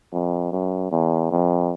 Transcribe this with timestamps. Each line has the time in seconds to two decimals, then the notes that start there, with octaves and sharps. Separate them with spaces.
0.12 F2
0.52 F#2
0.92 E2
1.31 F2